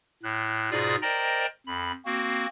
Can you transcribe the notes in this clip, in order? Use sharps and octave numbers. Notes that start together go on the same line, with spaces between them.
A2 F#6
G#2 B2 F4 G#4 D5 D#6
A#4 C5 D5 D#5 G5 A#5
F2 B5
A#3 C4 F#4